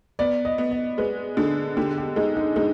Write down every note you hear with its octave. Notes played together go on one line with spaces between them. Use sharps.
B3 D5
D#5
B3
D#5
G#3 B4
D3 G#4
D3 G4
G4
G#3 D#4
D#4
G#3 D#4